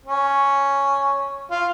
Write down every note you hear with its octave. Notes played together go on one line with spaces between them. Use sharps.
C#4
F4